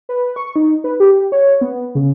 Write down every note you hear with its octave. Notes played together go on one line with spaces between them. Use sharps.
B4
C#6
D#4
B4
G4
C#5
B3
C#3